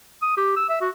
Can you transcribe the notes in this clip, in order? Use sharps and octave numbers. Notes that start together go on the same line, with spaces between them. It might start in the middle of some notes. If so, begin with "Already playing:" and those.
D#6
G4
E6
E5
F#4